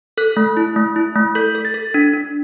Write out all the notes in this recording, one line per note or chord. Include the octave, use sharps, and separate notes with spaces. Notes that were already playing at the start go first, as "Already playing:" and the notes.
A4 F#6
A3
E4
A3
E4
A3
A4 G6
A4
A6
A4
D4
D4